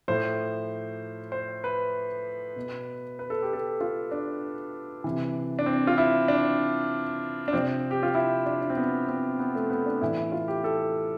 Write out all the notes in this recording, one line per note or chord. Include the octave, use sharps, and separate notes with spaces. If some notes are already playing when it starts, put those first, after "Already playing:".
A2 F3 C5
C5
B4
B2
B4
A4
G4
A4
F4
D4
C3 E3
D4
C4
F4
E4
D4
D4
C3 F3 C4
G4
F4
E4
D4
D4
C4
B3
C4
B3
A3
B3
D4
A2 E3 E4
E4
F4
G4
A4